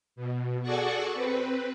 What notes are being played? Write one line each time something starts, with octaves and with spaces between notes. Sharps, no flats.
B2
F#4 G#4 A4 D5 F#5 C#6
C4 B4